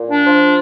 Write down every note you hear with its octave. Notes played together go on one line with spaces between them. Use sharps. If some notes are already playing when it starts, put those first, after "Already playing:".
Already playing: A#2
D4
F3